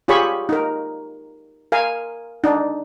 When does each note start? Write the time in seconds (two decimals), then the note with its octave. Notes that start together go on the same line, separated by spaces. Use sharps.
0.08 F4 G4 G#4 C#5 B5 C#6
0.49 D#4 A#4
1.72 A#4 F5 G#5
2.44 D4 D#4